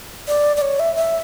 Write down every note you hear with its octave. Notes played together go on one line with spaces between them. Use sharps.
D5
D5
C#5
E5
E5